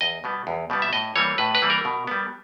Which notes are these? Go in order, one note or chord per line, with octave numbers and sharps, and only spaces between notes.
E2 D#5
B2 G3 B3
E2
B2 G3 B3
E5
A2 D#5
E3 G3 A#3 C#5
A2 B4
B4
E3 G3 A#3
A#4
B2
G3 B3